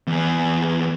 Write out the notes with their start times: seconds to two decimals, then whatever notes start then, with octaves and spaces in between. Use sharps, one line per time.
0.07 E2 G#4